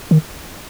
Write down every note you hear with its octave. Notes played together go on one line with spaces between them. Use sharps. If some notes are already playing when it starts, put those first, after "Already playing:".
D#3